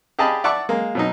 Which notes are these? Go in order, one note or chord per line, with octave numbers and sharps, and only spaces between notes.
G4 G#4 D#5 F5 A5 B5
D5 E5 F#5 A5 C#6
G#3 A#3
B2 F#3 D#4